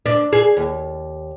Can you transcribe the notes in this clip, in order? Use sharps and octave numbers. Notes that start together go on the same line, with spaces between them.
D4
G#4
D#2